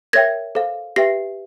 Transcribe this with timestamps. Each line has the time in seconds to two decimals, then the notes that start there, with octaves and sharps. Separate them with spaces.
0.13 A#4 C#5 E5 G5 G#6 A#6
0.55 A4 C5 F5
0.96 G4 B4 E5 G5 A#6 C7